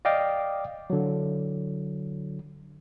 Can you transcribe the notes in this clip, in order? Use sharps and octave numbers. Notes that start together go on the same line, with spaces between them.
D5 D#5 F5 G5 D6
D3 F#3